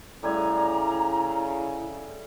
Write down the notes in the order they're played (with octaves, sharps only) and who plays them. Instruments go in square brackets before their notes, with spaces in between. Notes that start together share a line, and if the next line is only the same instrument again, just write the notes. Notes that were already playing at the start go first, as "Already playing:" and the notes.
[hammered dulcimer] A2 G3 G#5 [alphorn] C#3 [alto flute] E4 [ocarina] A#5